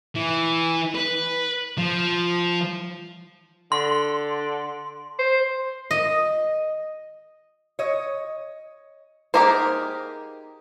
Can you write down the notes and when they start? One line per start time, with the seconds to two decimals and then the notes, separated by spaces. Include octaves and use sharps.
0.15 E3
0.95 B4
1.78 F3
3.72 D3 C6
5.19 C5
5.91 D#5
7.79 C#5 D#5
9.34 A#3 D#4 G4 G#4 A#4 C5